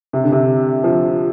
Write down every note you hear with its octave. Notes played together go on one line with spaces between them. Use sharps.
C3
D3
C3
F3